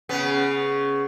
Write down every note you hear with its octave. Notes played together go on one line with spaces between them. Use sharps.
C#3 B3